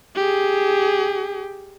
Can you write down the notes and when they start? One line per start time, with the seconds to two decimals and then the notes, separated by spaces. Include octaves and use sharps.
0.16 G4 G#4